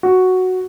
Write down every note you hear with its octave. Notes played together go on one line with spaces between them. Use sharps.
F#4